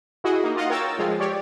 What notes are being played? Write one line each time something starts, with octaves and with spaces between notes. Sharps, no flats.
E4 F#4 G#4 D#5
A#3 D#4
F4 D#5 F5 F#5
A#4 C#5 G5 E6 A6
F3 G#3 F4
G4 C#5 D5